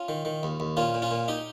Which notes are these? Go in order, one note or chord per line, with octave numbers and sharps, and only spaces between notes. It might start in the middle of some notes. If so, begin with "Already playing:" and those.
Already playing: C#4 F4
D#3
D#3
D#2
D#2
A#2 C#4 F4
A#2
C#4 F4
A#2
D#4 G4